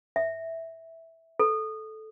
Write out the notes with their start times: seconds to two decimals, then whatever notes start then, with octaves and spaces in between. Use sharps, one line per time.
0.16 E5
1.39 A4